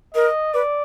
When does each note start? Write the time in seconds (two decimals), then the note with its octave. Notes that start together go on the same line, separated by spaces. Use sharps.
0.15 A#4 D#5
0.54 B4 D5